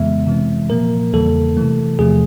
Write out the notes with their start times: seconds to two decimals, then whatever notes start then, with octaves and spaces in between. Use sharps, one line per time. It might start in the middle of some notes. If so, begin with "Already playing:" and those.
Already playing: F2 C#3 E3 G#3 B3 E5
0.27 C3 E3 G#3 C4
0.70 A#2 F3 A#3 A#4
1.13 E2 C#3 E3 G3 A#3 A4
1.57 C3 E3 A3
1.99 E2 C3 F3 A3 G#4